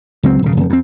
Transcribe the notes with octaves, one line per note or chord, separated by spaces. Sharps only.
C#2 F#3 C4
D#1 C#3
F1
F2 C4